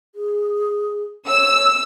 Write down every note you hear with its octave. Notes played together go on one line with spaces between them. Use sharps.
G#4
C#5 E6